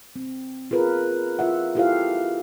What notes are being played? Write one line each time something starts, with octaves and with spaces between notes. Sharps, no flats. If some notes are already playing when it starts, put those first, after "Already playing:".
C4
F4 G#4 A#4 B4
F4 E5 F#5
E4 F4 G4 A4 C5 F5